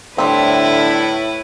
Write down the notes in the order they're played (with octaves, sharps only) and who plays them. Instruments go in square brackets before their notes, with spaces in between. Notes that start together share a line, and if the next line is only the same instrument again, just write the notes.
[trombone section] A2 [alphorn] D3 [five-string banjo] G3 C4 [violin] E4 B4